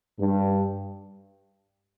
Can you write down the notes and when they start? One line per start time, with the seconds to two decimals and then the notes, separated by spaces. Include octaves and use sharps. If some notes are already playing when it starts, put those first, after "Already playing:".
0.20 G2